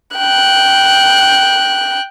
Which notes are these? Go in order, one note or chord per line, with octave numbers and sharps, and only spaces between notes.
G5 F#6